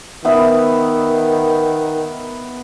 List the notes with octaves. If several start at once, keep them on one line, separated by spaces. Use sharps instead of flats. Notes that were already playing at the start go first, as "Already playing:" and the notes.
D#3 B3 B4 E5